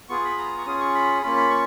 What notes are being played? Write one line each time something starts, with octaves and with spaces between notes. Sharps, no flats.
B3 F4 G#4 C#6
B5
A#5
C#6
C#4 F4 G#4 D#6
C#6
B5
A#3 C#4 F4 B5
B5
C#6